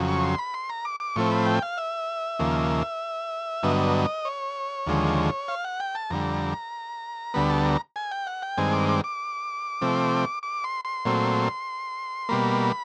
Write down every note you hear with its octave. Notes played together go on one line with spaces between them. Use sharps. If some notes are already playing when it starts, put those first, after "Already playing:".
Already playing: F2 C#3 F#3
C#6
C6
B5
C6
A#5
D6
D6
A2 F3 A3 C4 C#6
B5
G5
F5
E5
D#2 C#3 F3 A#3
G2 D3 F#3 B3 D#5
C#5
D#2 D3 F3 G#3
F5
F#5
G5
A5
F2 D3 G3 A#5
D2 D3 G3 B3 B5
A5
A#5
G#5
G5
F#5
G5
G2 D#3 G#3 C4 G#5
D6
D6
D6
C3 F3 A3 C4
D6
C6
C6
A#2 F#3 A3 C4
B2 G3 A#3 B5